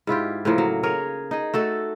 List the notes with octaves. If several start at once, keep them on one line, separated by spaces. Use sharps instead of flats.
G#2 E4 F4 G4
A2 C#3 F3 A#3
F#3
G#4 A#4 C#5
D#4 G#4
A3 F#4 A4